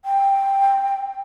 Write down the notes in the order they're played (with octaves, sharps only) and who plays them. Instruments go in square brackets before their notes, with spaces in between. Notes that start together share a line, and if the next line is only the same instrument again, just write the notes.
[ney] G5